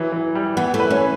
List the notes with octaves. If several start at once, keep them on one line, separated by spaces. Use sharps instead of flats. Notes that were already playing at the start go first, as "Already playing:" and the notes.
Already playing: E3 F#3
E3
G3
E3 B3
A3
B4
C#4